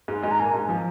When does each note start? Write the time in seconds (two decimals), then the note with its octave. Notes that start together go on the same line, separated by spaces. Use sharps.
0.08 G#2 G#3
0.22 G#2 G#3 G#5
0.31 A#5
0.39 A#2 A#3 G#5
0.53 G#2 G#3
0.69 F3